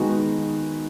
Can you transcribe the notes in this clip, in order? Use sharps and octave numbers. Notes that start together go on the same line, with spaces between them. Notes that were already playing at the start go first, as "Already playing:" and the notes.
Already playing: D#3 G#3 B3 D#4 F#4